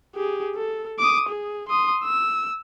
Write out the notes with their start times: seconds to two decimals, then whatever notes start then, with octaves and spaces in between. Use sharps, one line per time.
0.15 G4 G#4
0.55 A4
0.99 D6 D#6
1.29 G#4
1.68 C6 D#6
2.04 E6